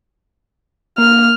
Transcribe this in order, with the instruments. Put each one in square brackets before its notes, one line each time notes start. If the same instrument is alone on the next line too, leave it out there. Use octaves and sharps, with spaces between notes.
[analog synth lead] A#3 [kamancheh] F6